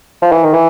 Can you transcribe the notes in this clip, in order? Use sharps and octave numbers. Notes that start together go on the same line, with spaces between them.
F3
E3
D#3
E3